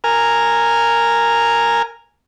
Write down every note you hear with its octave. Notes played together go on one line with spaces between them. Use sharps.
A#4 G#5 F6